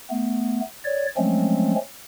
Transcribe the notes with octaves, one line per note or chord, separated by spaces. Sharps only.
A3 B3
C#5 D5
F3 F#3 G#3 A3 C4 C#4